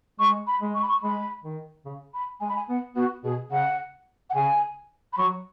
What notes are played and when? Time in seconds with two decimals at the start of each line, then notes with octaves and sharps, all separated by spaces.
0.19 G#3 C#6
0.47 B5
0.61 G#3
0.75 C#6
0.82 B5
0.89 C#6
1.03 G#3 B5
1.44 D#3
1.85 C#3
2.14 B5
2.40 G#3 G#5
2.49 B5
2.56 G#5
2.69 B3 F#5
2.96 B3 F#4
3.24 B2 G#4
3.51 C#3 F#5
4.30 F#5
4.35 C#3 G#5
5.13 B5
5.18 F#3 C#6